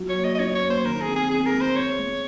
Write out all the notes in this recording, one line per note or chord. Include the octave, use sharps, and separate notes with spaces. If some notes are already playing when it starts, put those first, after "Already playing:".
Already playing: F#3
C#5
A#3
D#5
D#5
C#4 C#5
C#5
A#3
C5
D#3 A#4
G#4
C4
G#4
C4 G#4
A#4
G#3
C5
G#3 C#5
G#3